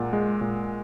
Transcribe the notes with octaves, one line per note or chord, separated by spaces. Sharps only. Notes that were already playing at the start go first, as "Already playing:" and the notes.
Already playing: A#2 G#3 F#5 A#5
G#3
A#2